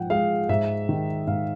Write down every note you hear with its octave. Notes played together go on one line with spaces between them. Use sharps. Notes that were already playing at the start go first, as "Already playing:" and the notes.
Already playing: G#2 F3 F#5 G5
G#3 F5
G#2 E5
D#3
G#2 F5